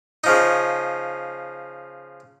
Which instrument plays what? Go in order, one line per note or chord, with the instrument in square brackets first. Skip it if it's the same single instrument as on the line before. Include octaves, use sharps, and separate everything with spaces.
[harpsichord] C#3 F3 D#4